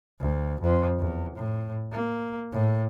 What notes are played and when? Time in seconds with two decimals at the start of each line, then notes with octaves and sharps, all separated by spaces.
0.20 D2
0.62 F2
0.99 E2
1.36 A2
1.92 A#3
2.53 A2